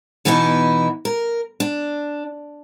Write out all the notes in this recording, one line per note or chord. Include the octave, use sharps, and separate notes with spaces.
B2 E3 B3 D#4 E4
A#4
D4